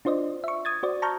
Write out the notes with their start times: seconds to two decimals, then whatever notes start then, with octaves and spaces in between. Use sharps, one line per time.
0.05 D4 F4 C5 D5 D#5
0.44 E5 C#6
0.65 D#6 G#6 A6
0.83 F#4 C5 D5
1.02 A5 A#5 C#6 F6 G6